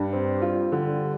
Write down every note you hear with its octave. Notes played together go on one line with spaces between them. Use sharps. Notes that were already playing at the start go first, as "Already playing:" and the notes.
Already playing: G2 G3
C4
F4
D3 G3